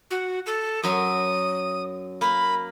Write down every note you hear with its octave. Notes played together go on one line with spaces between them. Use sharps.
F#4
A4
F#2 F#3 D#6
A#3 B5